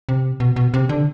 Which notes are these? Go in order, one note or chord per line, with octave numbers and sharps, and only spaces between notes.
C3
B2
B2
C3
D3